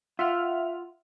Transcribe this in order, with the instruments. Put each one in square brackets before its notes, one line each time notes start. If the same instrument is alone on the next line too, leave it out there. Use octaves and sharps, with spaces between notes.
[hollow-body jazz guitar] F4 [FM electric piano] E5 F#5 F6